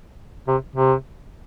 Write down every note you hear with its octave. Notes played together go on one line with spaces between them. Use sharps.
C3
C3